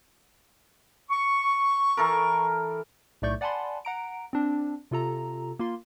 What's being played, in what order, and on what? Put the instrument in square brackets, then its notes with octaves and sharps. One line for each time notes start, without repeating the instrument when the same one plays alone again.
[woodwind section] C#6
[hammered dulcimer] E3 A4 A#4
[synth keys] B1 A2 A3 D5 C#6 G6
D5 F#5 G#5 A5 B5 C6
F#5 A#5 D7
C4 D4
C3 F4 A4 A#5
A#3 F4 C6